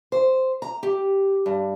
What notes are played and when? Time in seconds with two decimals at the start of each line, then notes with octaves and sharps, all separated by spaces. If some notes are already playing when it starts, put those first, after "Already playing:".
0.12 C5
0.62 A#5
0.83 G4
1.46 G2